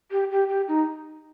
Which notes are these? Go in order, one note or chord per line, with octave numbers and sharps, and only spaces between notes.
G4
G4
G4
D#4